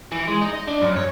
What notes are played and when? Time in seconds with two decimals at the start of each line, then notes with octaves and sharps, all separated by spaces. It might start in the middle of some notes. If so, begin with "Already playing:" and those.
0.12 E3
0.28 G#3
0.41 D#4
0.53 D#5
0.67 D4
0.82 F#2
0.96 C#5